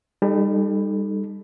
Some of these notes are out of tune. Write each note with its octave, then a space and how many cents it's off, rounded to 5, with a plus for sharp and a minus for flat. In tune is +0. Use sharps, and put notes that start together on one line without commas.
G3 +30 D#4 -20 A4 -5